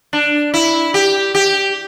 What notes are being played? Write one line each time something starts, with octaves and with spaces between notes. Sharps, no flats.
D4
E4
G4
G4